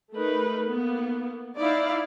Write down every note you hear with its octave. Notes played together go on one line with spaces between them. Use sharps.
A3 D#4 A#4 B4
A#3 B3
D#4 E4 D5 F5